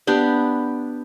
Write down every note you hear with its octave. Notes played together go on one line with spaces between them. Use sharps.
B3 D4 G4